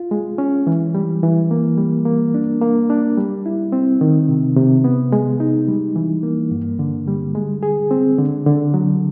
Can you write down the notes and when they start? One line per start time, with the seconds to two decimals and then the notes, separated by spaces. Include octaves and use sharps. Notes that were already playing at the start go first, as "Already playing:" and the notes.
Already playing: F4
0.11 G#3
0.38 C#4
0.67 E3
0.95 G3
1.23 E3
1.51 A#3
1.78 G3
2.05 A#3
2.34 D4
2.61 A#3
2.90 D4
3.17 G3
3.46 E4
3.72 C4
4.01 D#3
4.29 C3
4.56 C3
4.84 B3
5.12 G#3
5.40 D#4
5.68 G3
5.96 E3
6.23 A#3
6.51 G2
6.79 D3
7.08 G3
7.35 G#3
7.63 G#4
7.91 C4
8.18 D3
8.46 D3
8.74 F#3